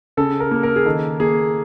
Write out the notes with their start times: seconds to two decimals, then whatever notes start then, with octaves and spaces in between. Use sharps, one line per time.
0.17 C#3 A4
0.40 A#4
0.51 A#3
0.63 A#4
0.76 G#4
0.86 D#3 A4
1.20 A#3 G#4